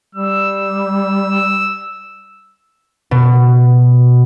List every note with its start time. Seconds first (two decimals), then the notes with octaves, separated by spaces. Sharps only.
0.15 G3 E6
3.11 B2